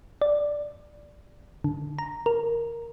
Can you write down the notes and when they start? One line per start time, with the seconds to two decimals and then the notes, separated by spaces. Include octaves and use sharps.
0.22 D5
1.64 D3
1.99 A#5
2.26 A#4